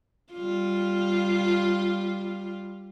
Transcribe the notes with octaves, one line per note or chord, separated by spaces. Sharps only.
G3 F4